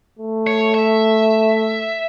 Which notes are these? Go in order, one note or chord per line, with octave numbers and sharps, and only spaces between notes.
A3
C#5
E5